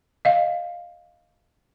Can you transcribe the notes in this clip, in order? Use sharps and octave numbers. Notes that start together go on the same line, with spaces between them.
D#5 F5